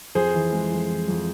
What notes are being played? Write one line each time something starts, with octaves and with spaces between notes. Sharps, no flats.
F2 G#4 C5
E3
G#3
F2
E3
F2